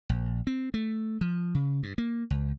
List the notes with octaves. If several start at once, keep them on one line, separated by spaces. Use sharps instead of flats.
A#1
C4
A3
F3
C#3
G2
A#3
C#2